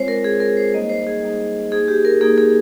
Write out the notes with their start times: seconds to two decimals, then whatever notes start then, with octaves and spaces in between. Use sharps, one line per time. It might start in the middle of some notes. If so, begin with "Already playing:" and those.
Already playing: G#3 C4 F4 C5 C#5
0.08 A#4
0.24 G#3 C4 F4 G#4
0.40 A#4
0.57 C5
0.73 G3 A#3 D#4 D#5
0.90 C5
1.07 G#4
1.22 G3 A#3 D#4
1.72 A#3 D#4 G#4
1.88 G4
2.05 A#4
2.21 A#3 D#4 G#4
2.38 G#4